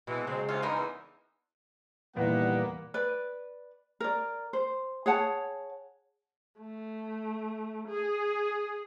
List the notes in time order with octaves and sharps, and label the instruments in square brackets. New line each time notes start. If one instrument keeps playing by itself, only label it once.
[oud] B2 F#3 [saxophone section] E3 G#3
[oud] C#3 G#3 [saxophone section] F#3 C4
[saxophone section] D2 C3 [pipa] F4
[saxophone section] G#2 C#4 A#4 [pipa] D3 B3 D#4
[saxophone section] E2
[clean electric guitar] E2 A#2 [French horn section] D#3 G3 E4 [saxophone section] A#3 B3 [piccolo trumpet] F#5
[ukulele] B4 D5
A#4 D5
C5
G#4 C#5 F#5 A5
[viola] A3
G#4